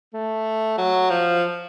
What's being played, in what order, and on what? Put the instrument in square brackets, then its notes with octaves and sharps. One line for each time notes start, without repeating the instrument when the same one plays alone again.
[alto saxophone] A3
F#3
F3